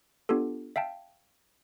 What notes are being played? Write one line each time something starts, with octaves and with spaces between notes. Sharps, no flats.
B3 D4 F4 G4 A4
E5 F5 G5 A5